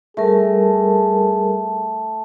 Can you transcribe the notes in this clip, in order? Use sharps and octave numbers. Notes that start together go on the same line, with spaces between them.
G3 A3 G#4 A#4 A5